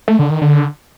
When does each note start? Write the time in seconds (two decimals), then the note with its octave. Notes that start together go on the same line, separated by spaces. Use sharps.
0.08 A3
0.19 D3
0.30 D#3
0.42 D3